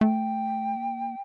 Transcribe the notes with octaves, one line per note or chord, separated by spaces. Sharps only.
A3 G5
A#3